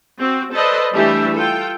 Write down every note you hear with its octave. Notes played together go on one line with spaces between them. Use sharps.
C4 F#4
A4 B4 C5 D5 D#5
E3 G3 A3 D4 G4 E5
F4 A4 G5